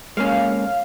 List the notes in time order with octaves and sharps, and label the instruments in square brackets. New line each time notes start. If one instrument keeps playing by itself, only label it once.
[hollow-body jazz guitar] G#3 A#3 C#4 [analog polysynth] F5